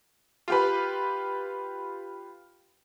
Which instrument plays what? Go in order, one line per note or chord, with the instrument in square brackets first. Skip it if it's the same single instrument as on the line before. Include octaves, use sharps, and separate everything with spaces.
[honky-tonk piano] F4 G4 B4